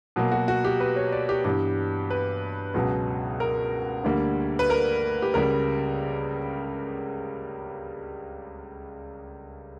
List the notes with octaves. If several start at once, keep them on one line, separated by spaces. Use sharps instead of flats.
B2 F#3 A#3
F#4
F#4
G4
B4
C#5
D5
G4
G2 E3 G3 B3 G4
B4
C#2 B2 F#3 B3
A#4
D2 D3 G3 A#3
B4
A#4
G4
C#2 C#3 G3 A#4